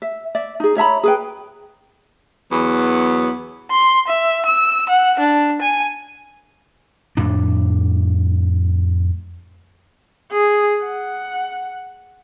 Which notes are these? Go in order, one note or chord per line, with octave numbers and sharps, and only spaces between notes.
E5
D5 E5
D#4 G#4
C#5 E5 A#5 B5
G#4 B4 G5
E2 F#3 B3
C6
E5
E6
F#5
D4
G#5
F2 A2 D4
G#4
F#5